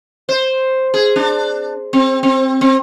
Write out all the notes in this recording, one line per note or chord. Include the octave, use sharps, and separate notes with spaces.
C5
G#4
D4
C4
C4
C4